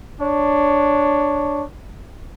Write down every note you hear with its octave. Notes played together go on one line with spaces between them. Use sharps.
D4 C#5